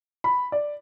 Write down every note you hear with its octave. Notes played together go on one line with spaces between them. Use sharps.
B5
D5